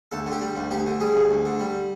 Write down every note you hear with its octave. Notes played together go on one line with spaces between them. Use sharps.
D2 A4
D3
G4
G3
D2
D2 G4
D3
G3 G#4
D2
D2
D3
G3